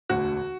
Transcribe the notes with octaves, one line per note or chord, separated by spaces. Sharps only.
E1 D2 D3 F#4